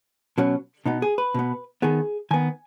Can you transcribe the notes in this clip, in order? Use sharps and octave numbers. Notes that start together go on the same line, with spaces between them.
B2 F#3 C#4
B2 B3 D#4
G#4
B4
B2 B3
D#3 B3 G#4
D#3 B3 G#5